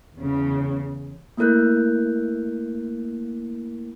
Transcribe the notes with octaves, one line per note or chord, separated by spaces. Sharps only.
E2 C#3
A3 A#3 E4 A#4 F#6 G6